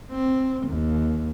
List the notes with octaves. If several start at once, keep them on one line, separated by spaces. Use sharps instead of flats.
C4
D#2